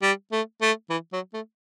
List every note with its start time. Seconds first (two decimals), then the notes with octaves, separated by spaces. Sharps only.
0.03 G3
0.32 A3
0.62 A3
0.90 E3
1.13 F#3
1.34 A3